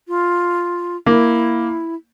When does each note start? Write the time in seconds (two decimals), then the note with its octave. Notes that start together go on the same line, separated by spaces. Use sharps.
0.08 F4
1.06 A#3 E4